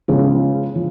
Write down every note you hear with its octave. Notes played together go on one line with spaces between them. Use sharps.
C#3 F3 G#3 B3
F3